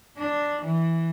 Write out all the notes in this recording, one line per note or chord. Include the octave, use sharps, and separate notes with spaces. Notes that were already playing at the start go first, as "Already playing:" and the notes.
D4
E3